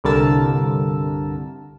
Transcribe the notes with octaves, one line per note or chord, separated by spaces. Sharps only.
C2 G2 D3 A#4 A5 E6